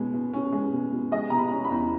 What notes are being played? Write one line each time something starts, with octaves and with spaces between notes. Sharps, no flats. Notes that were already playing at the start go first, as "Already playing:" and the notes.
Already playing: B2 G#3 C#4
B2
C#4
G#3
B2
B2
G#3 D#5
B2 A#5
B5
C#4
B5
E2